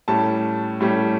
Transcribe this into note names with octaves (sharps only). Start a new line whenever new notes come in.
A2 G3 C#4 A5
A2 G3 C#4